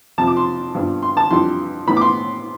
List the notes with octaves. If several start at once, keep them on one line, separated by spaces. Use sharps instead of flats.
F2 C3 F3 A5
D6
C6
G2 F3 B3 D4
C6
A5
F2 E3 G3 D4 C6
A2 E3 B3 B5
D6
C6